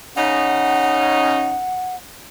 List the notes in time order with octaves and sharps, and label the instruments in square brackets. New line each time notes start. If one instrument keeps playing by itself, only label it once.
[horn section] C#3 C#4 D#4 [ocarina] F#5